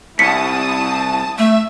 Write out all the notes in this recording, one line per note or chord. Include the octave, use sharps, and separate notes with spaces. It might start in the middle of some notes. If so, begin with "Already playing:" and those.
C2 E4 A5 D#6 B6 C#7
A3 E5